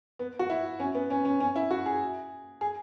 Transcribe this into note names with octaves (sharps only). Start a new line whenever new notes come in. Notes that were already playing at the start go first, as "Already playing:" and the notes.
B3
F#4
E4
C#4
B3
C#4
C#4
C#4
E4
F#4
G#4
G#4